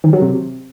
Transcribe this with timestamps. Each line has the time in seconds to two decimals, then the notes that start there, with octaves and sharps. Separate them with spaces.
0.04 D#3
0.13 F#3
0.22 C3